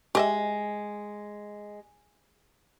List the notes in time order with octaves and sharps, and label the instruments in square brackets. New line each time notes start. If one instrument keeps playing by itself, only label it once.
[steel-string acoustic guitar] G#3 [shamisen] G4 D#5 E5